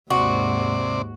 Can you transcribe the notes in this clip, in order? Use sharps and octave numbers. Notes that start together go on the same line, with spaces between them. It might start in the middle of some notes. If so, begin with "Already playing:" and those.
D#2 G#2 C3 F#4 D5